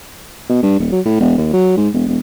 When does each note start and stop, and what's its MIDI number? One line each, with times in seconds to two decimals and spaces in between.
0.49 0.58 47
0.63 0.79 43
0.79 0.91 27
0.92 1.00 54
1.05 1.20 45
1.20 1.37 28
1.38 1.50 39
1.53 1.73 54
1.77 1.89 44
1.94 2.05 28
2.08 2.18 28